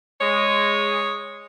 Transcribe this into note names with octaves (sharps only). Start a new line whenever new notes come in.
G#3 C#5